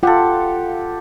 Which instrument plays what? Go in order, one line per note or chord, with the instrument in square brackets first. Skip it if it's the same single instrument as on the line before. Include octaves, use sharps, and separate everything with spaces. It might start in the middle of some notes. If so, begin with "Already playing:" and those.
[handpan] F4 F#5 [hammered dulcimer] G4 A4